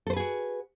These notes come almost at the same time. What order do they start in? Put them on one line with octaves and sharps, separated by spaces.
A4 C5 B4 G#4 F#4